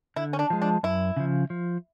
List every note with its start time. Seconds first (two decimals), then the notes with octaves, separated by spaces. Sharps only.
0.16 D3 E4
0.33 C#4
0.39 D4
0.50 F3 G#3
0.62 D4
0.83 F#2 E4
1.17 C#3 F3
1.50 F3